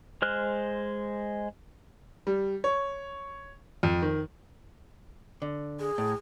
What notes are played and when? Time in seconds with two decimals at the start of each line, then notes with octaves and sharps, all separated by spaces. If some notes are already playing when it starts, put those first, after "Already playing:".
0.22 G#3 C5 F6 F#6
2.27 G3
2.64 C#5
3.83 F2
4.02 D#3
5.42 D3
5.80 G#4
5.98 A2